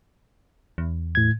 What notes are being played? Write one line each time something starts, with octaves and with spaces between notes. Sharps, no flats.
E2
A2 G#6